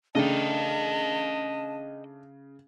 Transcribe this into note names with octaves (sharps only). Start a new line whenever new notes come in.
C#3 A3 D4 D#5 G5 A5